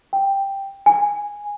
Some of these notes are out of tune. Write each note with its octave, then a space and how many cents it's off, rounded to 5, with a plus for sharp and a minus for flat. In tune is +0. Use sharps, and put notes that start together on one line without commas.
G5 +5
G#5 -10